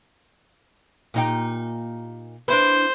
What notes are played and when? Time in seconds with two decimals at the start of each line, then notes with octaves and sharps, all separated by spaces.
1.14 A#2 D#4 G4
2.48 D4 E4 B4 C5